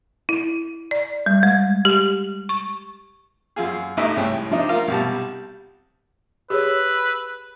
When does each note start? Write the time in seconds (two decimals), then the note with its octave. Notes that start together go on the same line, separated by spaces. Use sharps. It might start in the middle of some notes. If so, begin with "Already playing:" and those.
0.29 E4
0.91 D5
1.26 G3
1.43 G#3
1.85 G4
2.49 C#6
3.56 F#2 F4 G#4
3.97 A1 A2 A3 D#4 E4
4.17 C2 A2 G#3 C#5 G5
4.51 F3 D4 D#4
4.69 F4 A#4 A#5
4.88 B1 C3 G3 A5
6.50 G4 G#4 B4 C#5 E6